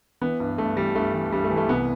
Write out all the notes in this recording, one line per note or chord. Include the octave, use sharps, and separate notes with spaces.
E3 B3
G2
G2 A3
E3 G3
G2 A3
E3
G2 G3
A3
E3
A3
C2 B3